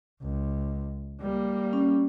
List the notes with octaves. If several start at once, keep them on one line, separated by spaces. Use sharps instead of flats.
C#2
G3 A#3
C#4